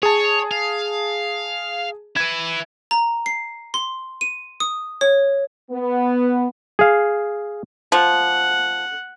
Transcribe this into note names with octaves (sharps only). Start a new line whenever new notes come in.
G#4 C#5 A5
F5
E4 B4 G#6
A#5
C7
C6
D#7
D#6
C#5
B3
G#4 F5
F3 F#5